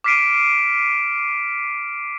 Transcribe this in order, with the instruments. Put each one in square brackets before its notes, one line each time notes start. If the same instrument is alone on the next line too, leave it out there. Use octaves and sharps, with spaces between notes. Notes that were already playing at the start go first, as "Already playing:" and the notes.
[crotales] D6 F6 B6 C7 D7 D#7